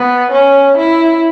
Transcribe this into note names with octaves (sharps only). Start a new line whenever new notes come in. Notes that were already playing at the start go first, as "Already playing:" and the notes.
Already playing: B3
C#4
E4